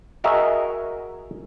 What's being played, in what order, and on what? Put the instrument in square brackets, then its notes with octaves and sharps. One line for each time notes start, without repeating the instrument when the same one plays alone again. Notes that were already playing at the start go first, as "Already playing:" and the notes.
[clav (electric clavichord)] F#4 G#4 A#4 D#5 E5